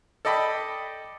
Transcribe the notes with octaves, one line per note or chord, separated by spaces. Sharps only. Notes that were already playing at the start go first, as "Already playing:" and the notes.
A4 D5 D#5 G5 B5